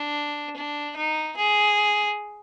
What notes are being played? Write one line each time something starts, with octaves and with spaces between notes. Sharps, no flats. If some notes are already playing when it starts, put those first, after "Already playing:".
Already playing: D4
D4
D#4
G#4